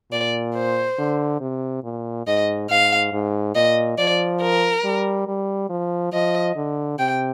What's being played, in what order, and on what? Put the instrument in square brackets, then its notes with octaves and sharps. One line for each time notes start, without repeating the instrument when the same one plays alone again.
[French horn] A#2 [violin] D5
[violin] C5
[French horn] D3
C3
A#2
[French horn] G#2 [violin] D#5
[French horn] G#2 [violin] F5
[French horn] G#2
[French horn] A#2 [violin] D#5
[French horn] F3 [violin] D5
[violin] A#4
[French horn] G3
G3
F3
[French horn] F3 [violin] D#5
[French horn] D3
[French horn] C3 [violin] G5